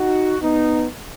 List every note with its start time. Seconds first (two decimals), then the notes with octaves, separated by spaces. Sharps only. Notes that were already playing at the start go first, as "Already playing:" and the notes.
Already playing: D#4 F#4
0.42 B3 D#4